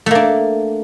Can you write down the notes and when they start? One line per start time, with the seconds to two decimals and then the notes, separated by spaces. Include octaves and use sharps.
0.06 A3
0.11 A#3
0.15 D4